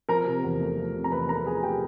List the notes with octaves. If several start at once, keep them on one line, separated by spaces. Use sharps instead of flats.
F3 A#4 A#5
C3
E2
A3
F3
C3
A#5
E2 B4 B5
A3 A#4 A#5
F3 G#4 G#5
C3 G4 G5